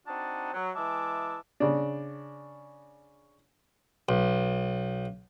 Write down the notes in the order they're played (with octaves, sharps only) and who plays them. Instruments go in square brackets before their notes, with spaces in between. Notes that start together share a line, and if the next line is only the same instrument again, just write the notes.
[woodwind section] C4 D4 D#4 F#4 A5
F#3
E3 G#3 E5 A5 D6
[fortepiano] C#3 D4
[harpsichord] B1